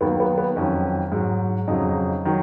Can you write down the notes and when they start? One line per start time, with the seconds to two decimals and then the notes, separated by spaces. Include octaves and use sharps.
0.01 D#2 D#3 F#3 B3
0.20 B3
0.38 B3
0.56 F2 D#3 F#3 C#4
1.12 G#2 F#3
1.68 F2 C#3 F#3 D#4
2.25 D#3 F#3